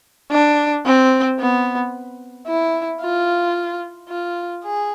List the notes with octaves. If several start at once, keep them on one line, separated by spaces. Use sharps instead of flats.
D4
C4
B3
E4
F4
F4
G#4